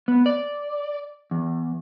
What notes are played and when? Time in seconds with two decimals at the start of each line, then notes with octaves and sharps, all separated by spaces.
0.08 B3
0.26 D5
1.31 E2